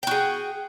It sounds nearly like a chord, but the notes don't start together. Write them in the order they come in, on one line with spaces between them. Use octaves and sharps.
G5 F#4 G#4